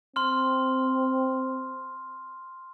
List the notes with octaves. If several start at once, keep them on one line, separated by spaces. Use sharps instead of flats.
C4 C6 F6